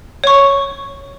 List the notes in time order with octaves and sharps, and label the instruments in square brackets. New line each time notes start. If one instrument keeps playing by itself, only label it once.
[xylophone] C#5 C#6